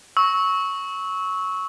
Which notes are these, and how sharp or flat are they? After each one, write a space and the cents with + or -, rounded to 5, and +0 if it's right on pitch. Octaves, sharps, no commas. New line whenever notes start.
C#6 +0 E6 -30